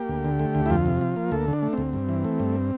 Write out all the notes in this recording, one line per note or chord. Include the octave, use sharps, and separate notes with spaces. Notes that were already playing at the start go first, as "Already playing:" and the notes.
Already playing: A#3 G4
D2
D3
A3
D2
E4
F2 F4
C3
F3
A#3
D2 A4
D3
D4
A3
D2 C4
G2
E3
A3
G2